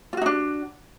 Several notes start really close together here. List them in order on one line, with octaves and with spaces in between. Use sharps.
F4 F#4 D#4 D4